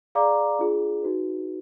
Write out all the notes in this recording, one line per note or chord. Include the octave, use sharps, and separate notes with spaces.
G#4 D5 F5 A#5 D6
D4 F4 G#4
D#4 F#4 B4